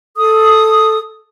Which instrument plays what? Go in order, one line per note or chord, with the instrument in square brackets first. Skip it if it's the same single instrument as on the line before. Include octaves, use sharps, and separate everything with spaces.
[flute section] A4 D#6